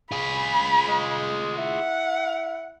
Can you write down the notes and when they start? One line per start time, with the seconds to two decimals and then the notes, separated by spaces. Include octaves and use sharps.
0.12 F4 G#4 B5
0.88 G#3
1.58 E4 F#5